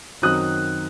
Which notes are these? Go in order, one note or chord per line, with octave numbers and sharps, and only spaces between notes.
F#2 D#3 F#3 C4 D#4 D#6 F#6